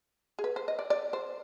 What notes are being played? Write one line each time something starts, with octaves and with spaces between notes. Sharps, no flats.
G#4
B4
C5
D#5
D5
D5
C5